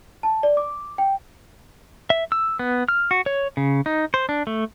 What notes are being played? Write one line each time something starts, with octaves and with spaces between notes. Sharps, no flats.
A5
D5
D6
G5
E5
E6
B3
F6
F#4
C#5
C#3
D#4
C5
D4
A3